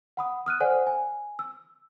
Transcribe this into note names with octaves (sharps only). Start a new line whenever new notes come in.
F#5 B5 D#6
D#6 F6 F#6 D#7
A4 C5 D5 F#5 G#5
G#5
E6